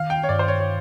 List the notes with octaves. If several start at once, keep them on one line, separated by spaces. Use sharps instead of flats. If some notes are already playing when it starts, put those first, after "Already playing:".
Already playing: D#3 F5
G5
C#5
G2 D5
C5
C#5
C#5